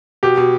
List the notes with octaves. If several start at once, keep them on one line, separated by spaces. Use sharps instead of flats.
B2 G4
B2